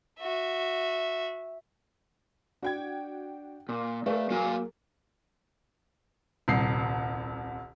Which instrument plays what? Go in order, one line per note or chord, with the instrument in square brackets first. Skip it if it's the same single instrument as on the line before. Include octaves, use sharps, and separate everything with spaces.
[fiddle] F#4 E5
[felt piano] D4 [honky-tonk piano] F#4 G5 G#6
[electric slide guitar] A#2
[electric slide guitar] A3 [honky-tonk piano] G#4 A#4 [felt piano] B4 D5 F5
[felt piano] F#3 [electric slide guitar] A#3 F5 G#5
[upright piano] D#1 C2 C7